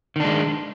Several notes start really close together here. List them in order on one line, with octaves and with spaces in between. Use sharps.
D#3 D4 G#3